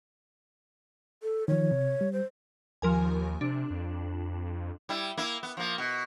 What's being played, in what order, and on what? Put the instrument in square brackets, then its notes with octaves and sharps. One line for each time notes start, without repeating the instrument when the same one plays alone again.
[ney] A4
[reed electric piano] D#3 F3 [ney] C#5
[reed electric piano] C3
G3
[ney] C5
[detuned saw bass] D#2 [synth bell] F3 A#4 G#5
[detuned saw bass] C3 [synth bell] D4
[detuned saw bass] F2
[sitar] G3 E4
A#3 E4
B3
F3 A#3
B2